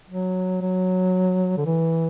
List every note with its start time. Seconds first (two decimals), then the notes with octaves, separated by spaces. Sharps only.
0.09 F#3
0.62 F#3
1.58 D3
1.66 E3